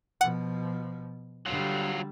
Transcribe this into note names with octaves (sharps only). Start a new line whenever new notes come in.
B2 F3 F#5
D3 F#3 G3 F4